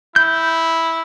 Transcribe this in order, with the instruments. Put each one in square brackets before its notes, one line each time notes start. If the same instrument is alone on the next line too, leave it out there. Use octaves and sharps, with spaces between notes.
[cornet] E4 [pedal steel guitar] G6